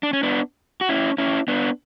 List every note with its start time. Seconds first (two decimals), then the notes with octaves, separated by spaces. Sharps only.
0.03 D4
0.13 C#4
0.23 B3 D4
0.81 F#4
0.89 C#4 E4
1.18 C#4 E4
1.48 B3 D4